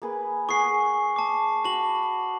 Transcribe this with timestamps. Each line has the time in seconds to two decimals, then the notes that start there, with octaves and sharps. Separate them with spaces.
0.02 A#3 G#4 B4
0.49 G#4 F#5 C#6 D#6 C7
1.16 A5 D6
1.65 F#4 A5 B5 F#7